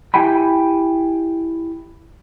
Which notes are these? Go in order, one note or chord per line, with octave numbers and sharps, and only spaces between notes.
E4 G4 G5 G#5 B5